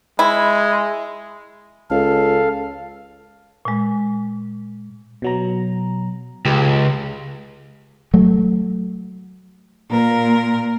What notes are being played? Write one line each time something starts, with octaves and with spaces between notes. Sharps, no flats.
G#3 E4
C#2 A4 F5
A#2 G#3
B2 F#3 A#5
C#2 G4
F#3 A3
A#2 A#4